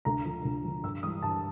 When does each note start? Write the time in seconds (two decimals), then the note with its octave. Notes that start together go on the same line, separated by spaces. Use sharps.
0.05 D2 A#5
0.25 D3 F3
0.45 D2
0.64 D3 F3
0.83 G2 E6
1.03 E3 G3 D#6
1.23 G2 A5